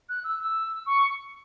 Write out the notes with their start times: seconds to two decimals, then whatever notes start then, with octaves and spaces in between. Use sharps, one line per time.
0.09 F#6
0.24 E6
0.40 E6
0.86 C#6